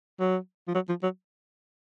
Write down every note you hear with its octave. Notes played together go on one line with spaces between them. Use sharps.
F#3
F3
F#3
F3
F#3